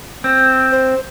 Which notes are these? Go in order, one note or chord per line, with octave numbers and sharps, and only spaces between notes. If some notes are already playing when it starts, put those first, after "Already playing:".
C4
C5